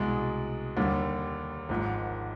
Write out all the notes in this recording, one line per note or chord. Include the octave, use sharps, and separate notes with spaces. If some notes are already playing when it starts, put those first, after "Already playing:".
Already playing: C2 B2 G#3
D#2 D3 G3
G#1 G#2 F3